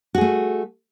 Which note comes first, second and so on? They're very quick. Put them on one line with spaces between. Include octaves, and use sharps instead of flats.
F#4 G#4 A3